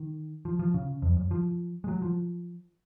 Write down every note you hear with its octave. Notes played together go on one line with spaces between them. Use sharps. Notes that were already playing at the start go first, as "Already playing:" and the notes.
Already playing: D#3
F3
F3
C#3
F2
F#2
F3
G#3
F#3
F3